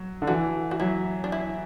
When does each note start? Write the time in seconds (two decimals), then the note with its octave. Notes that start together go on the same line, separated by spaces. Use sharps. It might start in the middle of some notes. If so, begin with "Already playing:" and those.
Already playing: F#3
0.22 D3
0.27 E3 F#4
0.71 F#4
0.80 F#3 E4
1.24 D4
1.32 E4